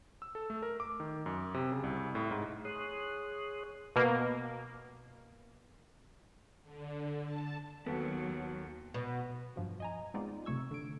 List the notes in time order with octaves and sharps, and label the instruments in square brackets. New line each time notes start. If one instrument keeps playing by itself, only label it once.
[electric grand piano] E6
A4
A3
A#4
D6
D#3
F#2
C3
C#3
C2
A2
G#2
[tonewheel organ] G#4 C#5 C6 D#6 F#6
[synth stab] B2 A#3
[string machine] D3
A5
[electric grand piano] D#2 A4 [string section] F#3 [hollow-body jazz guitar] B3
[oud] B2
[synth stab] G2 F3 F#3
D#5 G#5 A#5
G#3 B3 C4 D#4 F4 D5
G1 C3 A3 C#6 E6 G#6
D3 D7